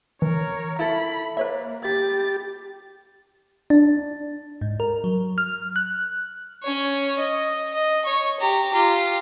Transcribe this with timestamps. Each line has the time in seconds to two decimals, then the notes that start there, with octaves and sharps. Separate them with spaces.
0.22 E3 A#4 C#5
0.79 E4 A4 B5
1.37 A#3 B4 C#5 E5
1.85 G4 B5 A6
3.70 D4
4.61 G#2
4.80 A#4
5.04 F#3
5.38 F6
5.76 F#6
6.63 C#4 C#5
7.19 D#5
7.74 D#5
8.05 C#5 C#6
8.40 G4 A#5
8.73 F4 G4